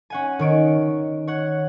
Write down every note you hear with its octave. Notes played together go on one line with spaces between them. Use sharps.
C#4 F#5 G#5
D#3 C#5 D7
C#5 F#5